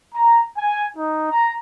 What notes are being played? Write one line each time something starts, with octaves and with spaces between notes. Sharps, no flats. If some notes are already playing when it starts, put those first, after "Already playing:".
A#5
G#5
D#4
A#5